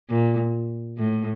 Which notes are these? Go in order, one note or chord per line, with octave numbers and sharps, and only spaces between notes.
A#2
A2